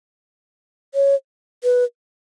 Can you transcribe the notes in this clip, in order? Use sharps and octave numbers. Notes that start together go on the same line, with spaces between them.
C#5
B4